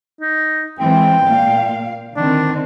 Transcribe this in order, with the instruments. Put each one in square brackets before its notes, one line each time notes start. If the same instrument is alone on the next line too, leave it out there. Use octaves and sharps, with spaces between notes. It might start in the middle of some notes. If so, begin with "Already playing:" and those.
[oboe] D#4
[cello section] E3 G#3 C4 [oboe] G5
[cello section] A#2 F5
[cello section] D3 D#3 C4 [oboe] D4